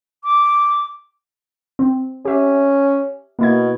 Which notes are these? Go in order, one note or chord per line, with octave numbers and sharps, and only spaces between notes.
D6
C4
C#4 G4 E5
B2 A#3 E4 G#6